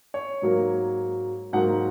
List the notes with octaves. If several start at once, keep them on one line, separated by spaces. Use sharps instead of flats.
C#5
G#2 F#3 A#3
G#2 F#3 A#3 F#5